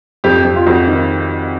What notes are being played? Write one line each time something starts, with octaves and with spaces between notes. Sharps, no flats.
F2 G4
F2
F4
F2 F#4
D#3